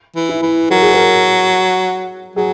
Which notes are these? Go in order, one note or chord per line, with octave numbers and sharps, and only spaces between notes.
E3
E4
E3
F#3 A#4
G#4
A#4
F#3 G#4